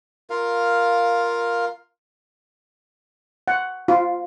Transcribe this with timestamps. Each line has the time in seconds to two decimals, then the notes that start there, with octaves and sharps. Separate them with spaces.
0.30 F4 A#4 F5
3.48 F#5
3.88 F4